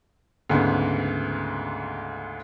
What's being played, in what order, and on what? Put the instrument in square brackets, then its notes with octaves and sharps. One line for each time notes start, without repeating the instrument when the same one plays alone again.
[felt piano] D2 G#2 C#3 B3